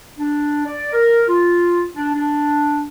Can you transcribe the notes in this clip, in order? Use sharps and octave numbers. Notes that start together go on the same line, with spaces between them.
D4
D5
A#4
F4
D4
D4